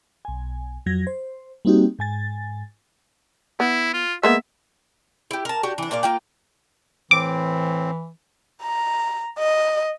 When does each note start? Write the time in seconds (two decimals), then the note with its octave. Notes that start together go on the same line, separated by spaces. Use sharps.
0.25 B1 G#5
0.86 F2 F#3 G#6 A#6
1.07 C5
1.65 G3 A#3 C4 D#4 F#4 G4
1.99 G#2 G#5 A6
3.60 B3 E4
3.94 F4
4.23 G#3 A#3 B3 E5
5.31 E4 G4
5.45 A#4 A5
5.63 D4 F#4 G4
5.78 E3 D4
5.91 A#2 A#3 D4 F5
6.03 A#3 F4 G5
7.11 A2 E3 C4 D6
8.62 A#5
9.39 D#5